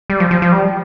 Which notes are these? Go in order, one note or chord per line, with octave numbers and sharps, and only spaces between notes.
G3
F3
F3
F3
G3